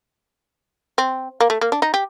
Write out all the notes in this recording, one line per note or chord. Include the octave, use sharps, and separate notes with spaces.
C4
A#3
A3
A#3
D4
D#4
G4